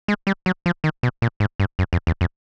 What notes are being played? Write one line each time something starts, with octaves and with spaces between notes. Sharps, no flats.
G#3
G3
F#3
F3
D#3
B2
A#2
G#2
G2
F#2
F2
E2
F2